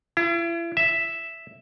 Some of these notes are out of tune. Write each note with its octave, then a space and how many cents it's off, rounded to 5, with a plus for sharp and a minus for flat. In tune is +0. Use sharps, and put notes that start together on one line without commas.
E4 +40
E5 +0